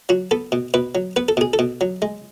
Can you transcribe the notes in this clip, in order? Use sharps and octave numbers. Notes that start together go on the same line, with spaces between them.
F#3 F#4
B3 A4
B2
B2 B4
F#3
B3 B4
A4
B2 G#4
A4
B2
F#3
G#3